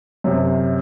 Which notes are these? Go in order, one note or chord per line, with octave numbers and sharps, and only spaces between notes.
F#2 C3